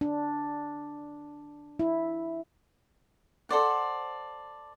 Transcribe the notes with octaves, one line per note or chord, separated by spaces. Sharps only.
D4
E4
A4 C5 D5 F#5